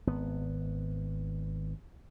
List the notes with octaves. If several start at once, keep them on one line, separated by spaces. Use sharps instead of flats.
G#1 B3